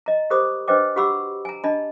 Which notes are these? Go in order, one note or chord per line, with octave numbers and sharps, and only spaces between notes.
D#5 A#5
G4 A#4 C5 B5 D6 D#6
D4 B4 C5 D#5 G5 D6
F#4 G4 F#5 B5 D6 E6
G#5 A#5
D4 D#5 A5 B5